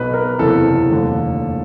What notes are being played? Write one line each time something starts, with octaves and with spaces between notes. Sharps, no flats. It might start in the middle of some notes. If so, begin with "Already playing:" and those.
Already playing: B1 B2 B4
A#4
F#1 E2 C3 A4
F1 D#2 D3